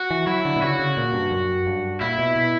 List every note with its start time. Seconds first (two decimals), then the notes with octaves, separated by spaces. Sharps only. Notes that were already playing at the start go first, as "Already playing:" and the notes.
Already playing: F#4
0.11 E3
0.27 F#3 E4
0.45 D3
0.56 B2
0.62 C#3 F#4
0.79 C#3
0.97 A#2
1.14 G2
1.32 F#2
1.66 G2
2.01 A#2 E4
2.19 B2
2.36 B2